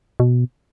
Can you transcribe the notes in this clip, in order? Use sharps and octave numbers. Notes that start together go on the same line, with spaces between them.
B2